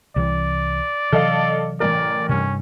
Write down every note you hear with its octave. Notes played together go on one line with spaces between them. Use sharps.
C2 C3 E3 D5
C3 E3 F#3 A4 D#5 F5
A1 A#4 D5
G2 C3 C#4